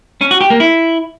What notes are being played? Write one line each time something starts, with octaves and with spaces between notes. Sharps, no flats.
C#4
F#4
G4
A#3
E4